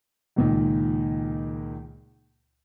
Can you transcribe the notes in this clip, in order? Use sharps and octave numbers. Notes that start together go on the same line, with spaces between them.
C#2 A#2 D#3